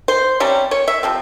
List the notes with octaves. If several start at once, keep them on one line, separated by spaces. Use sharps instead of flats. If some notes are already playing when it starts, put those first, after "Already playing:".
C5
C3 G3 C#4
C#5
E5
C3 F3 C4